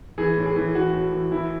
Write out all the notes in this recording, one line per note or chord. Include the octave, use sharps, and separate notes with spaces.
E3 G#4
A2
G#4
E3
E3 F#4
A2
E3
E3 E4